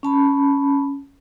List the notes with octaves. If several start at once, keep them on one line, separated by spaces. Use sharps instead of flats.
C#4 A5 B5